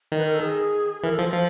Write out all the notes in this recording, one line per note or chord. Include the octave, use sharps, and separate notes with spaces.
D#3
B4
A#4
A4
G#4
E3 A#4
A4
F3
F3